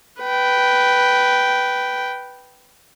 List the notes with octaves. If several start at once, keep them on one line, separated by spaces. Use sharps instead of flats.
B4 G5